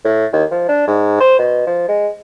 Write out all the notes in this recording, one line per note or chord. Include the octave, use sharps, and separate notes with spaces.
A2
D#2
F3
D4
G#2
C5
B2
F3
G#3